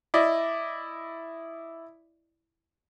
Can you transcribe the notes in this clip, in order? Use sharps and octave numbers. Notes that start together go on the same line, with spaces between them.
E4 D5 D#5